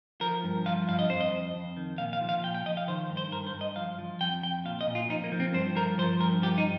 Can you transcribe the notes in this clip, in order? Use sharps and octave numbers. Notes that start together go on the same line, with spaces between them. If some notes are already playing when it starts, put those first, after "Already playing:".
F3 A#4
G2
F3 F5
G2 F5
D#5
F2 C5
D#5
F2
F2
D#3
A#2 F5
F5
F3
F5
A#2 G5
G5
F3 D#5
F5
D#3 C5
G2
C5
G2 A#4
C5
G2
D#5
F3 F5
F3
F2 G5
F2 G5
A#2 F5
D#5
A#2
F4
F3 D#4
A#3
F3
C4
G2 C5
F3 A#4
F3 C5
G2 A#4
F3 G4
D#4